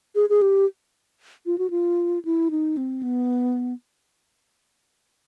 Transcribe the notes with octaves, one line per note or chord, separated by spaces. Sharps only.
G#4
G#4
G4
F4
F#4
F4
E4
D#4
C4
B3